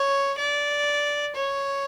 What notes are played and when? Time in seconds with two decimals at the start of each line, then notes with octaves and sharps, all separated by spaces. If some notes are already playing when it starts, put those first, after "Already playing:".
Already playing: C#5
0.38 D5
1.35 C#5